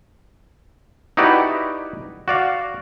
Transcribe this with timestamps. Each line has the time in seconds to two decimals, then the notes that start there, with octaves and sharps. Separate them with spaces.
1.17 D#4 E4 F#4 G4 B4 D5
2.28 F#4 D5 F5